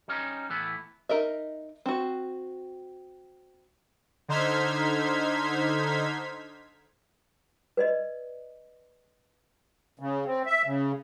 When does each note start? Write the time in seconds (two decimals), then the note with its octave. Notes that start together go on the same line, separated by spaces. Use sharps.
0.08 G3 C#4 D#4
0.50 A2 E3 B3
1.09 D#4 A#4 D#5 E5
1.86 C4 F#4
4.28 D3 D#4 C5 F6 G#6 B6
7.77 B4 D5 D#5
10.00 C#3
10.26 C4
10.46 E5
10.66 C#3